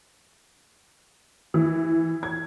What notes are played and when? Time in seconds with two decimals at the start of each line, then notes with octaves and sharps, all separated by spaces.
1.54 E3
2.23 G#6